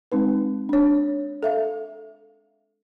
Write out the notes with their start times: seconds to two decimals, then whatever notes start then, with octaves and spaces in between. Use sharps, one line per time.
0.12 G#3 C4 D#4 B4
0.69 D4 C#5
1.43 A4 E5 F5